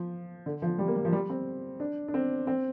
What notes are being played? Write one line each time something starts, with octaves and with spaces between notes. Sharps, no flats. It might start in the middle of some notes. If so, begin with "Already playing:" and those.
Already playing: F3
D3
F3
G3
A#3
G3
F3
G3
C4
D4
D4
C4
C4